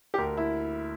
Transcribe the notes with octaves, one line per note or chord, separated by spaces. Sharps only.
G4
D2 A#4
E4